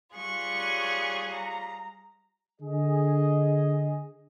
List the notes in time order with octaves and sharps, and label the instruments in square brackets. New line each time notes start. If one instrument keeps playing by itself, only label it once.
[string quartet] G3 F4 G#4 [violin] C#6 F#6
[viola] C#5 G#5
A#5
[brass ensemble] D3 G#4 D#5